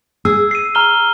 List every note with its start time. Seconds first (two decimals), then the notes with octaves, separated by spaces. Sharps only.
0.25 G#4 E6
0.51 C7 D#7
0.75 A#5 F6 G7